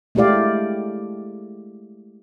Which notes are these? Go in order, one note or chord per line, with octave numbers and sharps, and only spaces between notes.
G#3 A3 E4 G4 D5 F5